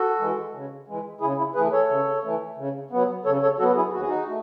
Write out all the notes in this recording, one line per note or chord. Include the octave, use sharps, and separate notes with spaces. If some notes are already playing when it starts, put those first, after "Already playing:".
Already playing: F#4 A4
E3 G#3
C#3
E3 G#3
C#3 E4 G#4
E4
E3 A3 G#4 B4
A4 C#5
C#3
E3 A3
C#3
F#3 B3
C#3 A4 C#5
A4 C#5
F#3 B3 F#4 A4
E4 G#4
D#2 F#4
G#4
D#4 F#4
A3